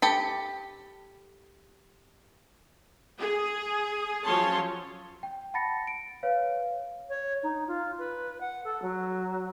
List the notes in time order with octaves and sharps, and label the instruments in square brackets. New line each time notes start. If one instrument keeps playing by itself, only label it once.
[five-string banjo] G4 A4 B5
[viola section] G#4
F3 F#3 C#4 C#5 A5 C6
[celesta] G5
F#5 A5 B5 A6 A#6 C#7
D7
B4 C#5 F5
[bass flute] C#5
D#4
F4
B4
F#5
A4
F#3